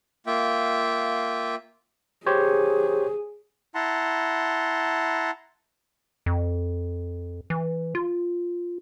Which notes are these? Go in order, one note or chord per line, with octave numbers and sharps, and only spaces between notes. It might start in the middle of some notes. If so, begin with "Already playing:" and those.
A#3 F4 E5 G5
G4 G#4 C5 C#5
E4 F#5 A5 A#5 C6
F2
E3
F4